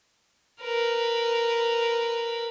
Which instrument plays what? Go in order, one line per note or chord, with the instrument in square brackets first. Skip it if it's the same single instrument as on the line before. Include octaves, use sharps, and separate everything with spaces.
[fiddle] A#4 B4